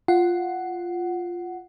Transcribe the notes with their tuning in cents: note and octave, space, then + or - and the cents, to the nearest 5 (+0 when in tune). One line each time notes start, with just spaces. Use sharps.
F4 +0 F#5 +5